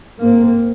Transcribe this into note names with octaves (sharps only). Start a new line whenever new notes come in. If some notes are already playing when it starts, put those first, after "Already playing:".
G#2 A#3 C4